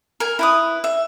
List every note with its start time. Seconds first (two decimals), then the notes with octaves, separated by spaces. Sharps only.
0.20 A#4 G#5
0.39 E4 B4 D#6
0.84 E5